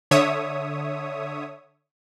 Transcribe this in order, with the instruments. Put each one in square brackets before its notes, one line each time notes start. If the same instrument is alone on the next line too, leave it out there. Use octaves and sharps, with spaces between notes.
[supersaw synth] D3 C#5 E5 D#6